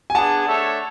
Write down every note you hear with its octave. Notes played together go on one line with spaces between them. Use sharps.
G#5
B3 D4 G#4 F#5 A5
A3 D4 A4 C#5 E5